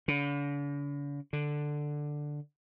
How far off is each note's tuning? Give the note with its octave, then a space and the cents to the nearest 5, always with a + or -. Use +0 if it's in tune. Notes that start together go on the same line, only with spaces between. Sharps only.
D3 -45
D3 +5